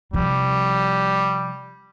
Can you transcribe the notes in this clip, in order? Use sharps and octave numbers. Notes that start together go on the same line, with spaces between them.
C3 F3 G3